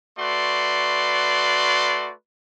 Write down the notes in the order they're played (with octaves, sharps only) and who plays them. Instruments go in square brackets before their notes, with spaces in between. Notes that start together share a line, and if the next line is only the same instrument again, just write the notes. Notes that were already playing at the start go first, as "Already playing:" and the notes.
[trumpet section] A3 F#4 B4 D5 C6